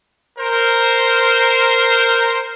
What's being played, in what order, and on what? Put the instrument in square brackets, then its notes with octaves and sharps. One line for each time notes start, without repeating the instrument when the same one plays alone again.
[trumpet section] A#4 C5